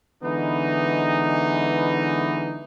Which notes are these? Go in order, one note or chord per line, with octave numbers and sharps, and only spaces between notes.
D3 E3 G#3 B3 D#4